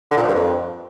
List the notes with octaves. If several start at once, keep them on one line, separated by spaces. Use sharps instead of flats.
D3
A#2
F3
G2
F2